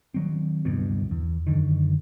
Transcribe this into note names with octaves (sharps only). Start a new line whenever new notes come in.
D#3 F#3 C4
D1 C2 G2 B2
E2
F#2 D3 D#3